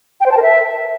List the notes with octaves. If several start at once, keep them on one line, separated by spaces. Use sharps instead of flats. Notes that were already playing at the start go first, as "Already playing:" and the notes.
G5
C5
A5
A#4
E5